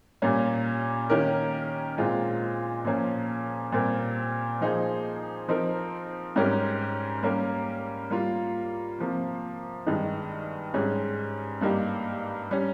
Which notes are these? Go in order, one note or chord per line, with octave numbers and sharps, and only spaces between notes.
A#2 G3 A#3 C#4
D#3 A#3 C#4 G4 A#4
A#2 G#3 C4 F4
A#2 F3 A#3 C#4
A#2 G3 C4 G4 A#4
F3 A#3 D#4 G#4 C5
F3 C4 D#4 A#4
G#2 G3 C#4 G4 A#4
G3 A#3 C#4 G4 A#4
G3 A#3 F4
C3 F3 A#3
G2 D#3 G#3 D#4
G#2 G3 C#4 G#4
G2 G3 A#3 D#4 G4
G3 C#4